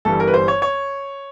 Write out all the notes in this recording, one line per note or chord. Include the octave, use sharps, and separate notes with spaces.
G1 G2 E3 G3 A4
A#4
B4
C5
C#5
C#5